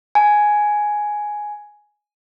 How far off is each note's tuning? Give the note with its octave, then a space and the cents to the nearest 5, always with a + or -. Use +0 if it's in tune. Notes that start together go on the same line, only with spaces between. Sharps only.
G#5 +5